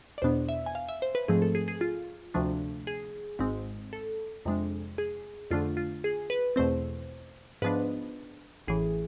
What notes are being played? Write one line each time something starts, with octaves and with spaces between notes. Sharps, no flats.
D5
E2 B2 B3 D4 C5
E5
G#5
F5
E5
C5
B4
G#2 F3 A3 C4 G#4
A4
G#4
G#4
F4
D2 C3 F3 A3 D4
G#4
G#1 G#2 G#3 C4
A4
F2 C3 G#3 D4
G#4
F2 D3 A3 D4 F4
F4
G#4
B4
E2 B2 A3 C4 C5
G#2 F3 B3 D4 B4
A1 A2 E3 G#4